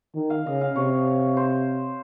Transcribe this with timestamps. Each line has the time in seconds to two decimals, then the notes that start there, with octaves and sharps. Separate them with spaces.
0.15 D#3
0.30 F5
0.46 C#3 D#5
0.61 F5
0.76 C3 C#5
1.37 C5